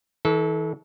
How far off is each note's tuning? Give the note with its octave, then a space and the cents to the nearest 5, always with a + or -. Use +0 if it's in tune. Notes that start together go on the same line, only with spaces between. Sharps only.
E3 -45 A4 -20